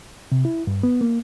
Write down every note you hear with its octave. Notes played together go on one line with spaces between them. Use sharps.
C3
E4
G2
B3
A#3